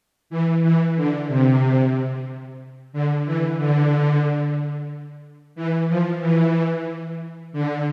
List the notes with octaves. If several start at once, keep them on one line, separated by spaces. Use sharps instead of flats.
E3
E3
D3
C3
D3
E3
D3
E3
F3
E3
D3